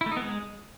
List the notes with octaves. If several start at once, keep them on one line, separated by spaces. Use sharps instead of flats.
E4
A3
D#4
B3
G#3